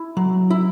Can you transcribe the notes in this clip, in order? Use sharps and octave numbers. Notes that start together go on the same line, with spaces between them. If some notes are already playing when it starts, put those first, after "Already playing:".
Already playing: E4
F#3
E4